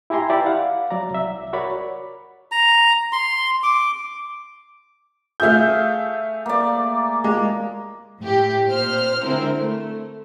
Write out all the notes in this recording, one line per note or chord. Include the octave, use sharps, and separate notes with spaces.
E4 G4 G#5 A#5 C6
E4 G4 B4 D5
F5 F#5
F#3 D5 A#5
C2 E5
F#4 A#4 C#5 D5 B5
A#5
C6
D6
A3 G#4 E5 F5 G6
A#3 D5
G#3
A2 G4
A#2 C5 F6
D3 G#3 C4 E4 A#4 C5
A3